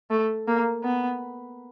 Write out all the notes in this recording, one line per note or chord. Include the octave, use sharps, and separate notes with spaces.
A3
A#3
B3